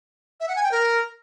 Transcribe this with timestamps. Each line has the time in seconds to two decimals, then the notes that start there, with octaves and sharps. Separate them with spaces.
0.40 E5
0.48 F#5
0.56 G#5
0.64 G5
0.72 A#4